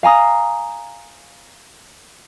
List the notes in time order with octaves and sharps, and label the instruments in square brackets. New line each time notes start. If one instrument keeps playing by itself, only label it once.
[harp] F5 G#5 A#5 D#6